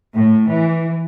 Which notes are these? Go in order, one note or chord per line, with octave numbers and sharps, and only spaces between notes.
A2
E3